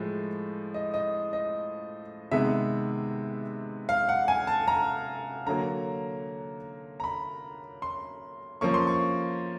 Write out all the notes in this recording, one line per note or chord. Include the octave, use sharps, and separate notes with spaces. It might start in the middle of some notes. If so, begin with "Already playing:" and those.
Already playing: A2 F3 G#3
D#5
D#5
D#5
C3 D#3 G#3 B3 E5
F5
F#5
G#5
A5
A#5
D3 F#3 A#3 A#5
A#5
B5
C6
F3 A#3 C#4 C#6
C6
C#6